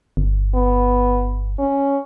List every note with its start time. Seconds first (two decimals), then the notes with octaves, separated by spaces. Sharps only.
0.17 G1
0.55 B3
1.59 C#4